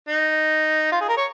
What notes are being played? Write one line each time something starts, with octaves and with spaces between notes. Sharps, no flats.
D#4
F4
G#4
A#4
C#5